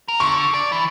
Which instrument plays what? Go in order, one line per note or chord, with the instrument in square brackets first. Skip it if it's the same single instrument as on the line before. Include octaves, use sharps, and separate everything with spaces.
[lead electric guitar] A#4
[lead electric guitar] D3 [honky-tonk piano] C#6
[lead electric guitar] D5
E3